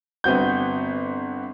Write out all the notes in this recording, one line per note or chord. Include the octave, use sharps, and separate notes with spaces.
G1 B3 C4 F#4 G6